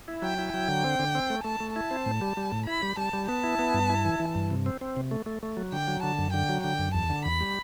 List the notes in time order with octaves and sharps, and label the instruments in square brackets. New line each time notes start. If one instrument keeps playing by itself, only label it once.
[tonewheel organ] E4
[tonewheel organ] F#3 [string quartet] G5
[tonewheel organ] E4
[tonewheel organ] F#3 [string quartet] G5
[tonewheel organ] D3
C4
D3
C4
A3
[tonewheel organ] A3 [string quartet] A5
[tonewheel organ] A3
[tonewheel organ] E4 [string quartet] A5
[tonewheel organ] C4
A2
G3
G3
A2
[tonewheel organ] E4 [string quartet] B5
[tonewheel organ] G3
[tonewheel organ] G3 [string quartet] A5
[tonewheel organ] G3
[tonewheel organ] B3 [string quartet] A5
[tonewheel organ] E4
B3
G2
E4
E3
E3
G2
C3
C4
C4
C3
A3
A3
A3
F#3
[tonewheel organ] D3 [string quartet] G5
[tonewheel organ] F#3
[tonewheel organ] D3 [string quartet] A5
[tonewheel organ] F#2
[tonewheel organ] D3 [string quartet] G5
[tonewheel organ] F#3
[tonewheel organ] D3 [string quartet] G5
[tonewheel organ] F#2
[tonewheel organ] E2 [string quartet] A5
[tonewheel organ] D3
[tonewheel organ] E2 [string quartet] B5
[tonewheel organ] G3